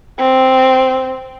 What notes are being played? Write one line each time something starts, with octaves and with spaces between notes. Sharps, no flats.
C4